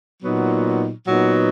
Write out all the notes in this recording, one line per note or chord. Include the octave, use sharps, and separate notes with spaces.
A#2 F#3 B3 D#4
A#2 F#3 B3 D#4